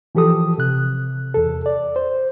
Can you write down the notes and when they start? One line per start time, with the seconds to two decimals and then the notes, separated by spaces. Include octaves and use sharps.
0.15 E3 F3 G4 A4 D#6
0.58 C3 F#6
1.34 E2 A4
1.66 D5
1.96 C5